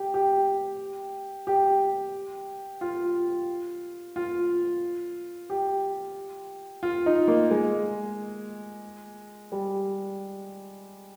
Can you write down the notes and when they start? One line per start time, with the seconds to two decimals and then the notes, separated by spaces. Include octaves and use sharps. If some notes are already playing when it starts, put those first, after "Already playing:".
Already playing: G4
0.14 G4
1.47 G4
2.81 F4
4.16 F4
5.50 G4
6.83 F4
7.06 D#4
7.28 A#3
7.51 G#3
9.52 G3